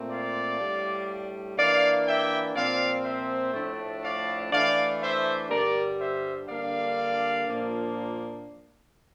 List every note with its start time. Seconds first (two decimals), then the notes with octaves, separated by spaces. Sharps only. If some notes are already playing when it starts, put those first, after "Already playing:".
Already playing: A#2 A3 C4
0.09 D5 F5
0.59 A2 G3 D4
1.57 E3 A#3 D4 D5 F5
2.06 E5 G5
2.55 A#2 F3 C4 D5 F5
3.04 C5 E5
3.54 A2 F3 A3 D4
4.03 D5 F5
4.52 E3 A3 D4 D5 F5
5.01 C5 E5
5.50 G2 D3 G3 A#4 D5
5.99 C5 E5
6.48 D3 G3 A#3 D4 D5 F5
7.47 A#2 F3 A#3 D4